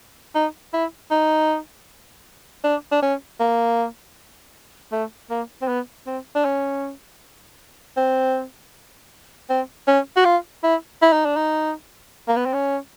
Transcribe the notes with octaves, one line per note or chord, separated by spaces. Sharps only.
D#4
E4
D#4
D4
D4
C#4
A#3
A3
A#3
C4
B3
C4
D4
C#4
C4
C4
C#4
F#4
F4
E4
E4
D#4
D4
D#4
A#3
B3
C4
C#4